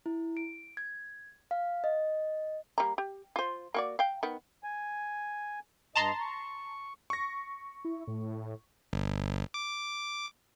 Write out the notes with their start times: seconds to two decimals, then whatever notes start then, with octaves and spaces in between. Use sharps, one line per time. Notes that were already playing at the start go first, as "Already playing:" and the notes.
0.06 E4
0.37 D7
0.77 G#6
1.51 F5
1.84 D#5
2.78 G3 A#3 A#5
2.98 G4
3.36 F4 C5
3.74 A#3 F#4 D5
3.99 F5 G5
4.23 D#3 B3
4.64 G#5
5.95 G2 D#5 A5 A#5 C6
6.21 C#6
7.10 C#6 A#6
7.85 E4
8.07 A2
8.93 G1
9.54 D6